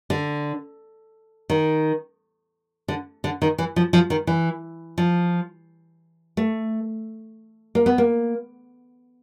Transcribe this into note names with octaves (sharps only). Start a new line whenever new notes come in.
D3
D#3
D3
D3
D#3
E3
F3
F3
D#3
E3
F3
A3
A#3
B3
A#3